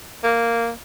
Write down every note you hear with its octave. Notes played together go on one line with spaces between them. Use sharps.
A#3